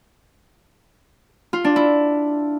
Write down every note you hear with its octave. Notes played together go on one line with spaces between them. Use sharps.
F4
D4
E4